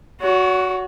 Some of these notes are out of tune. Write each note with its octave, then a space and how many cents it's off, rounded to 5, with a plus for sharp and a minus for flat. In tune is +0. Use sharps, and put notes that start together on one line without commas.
F#4 +0 C#5 +45